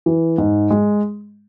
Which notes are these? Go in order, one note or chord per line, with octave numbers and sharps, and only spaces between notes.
E3
G#2
G#3